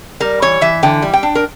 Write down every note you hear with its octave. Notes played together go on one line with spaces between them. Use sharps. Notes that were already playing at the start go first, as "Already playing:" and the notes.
G3 A#4
E3 C#5
E3 E5
D3 G5
G3
G5
D4
A#4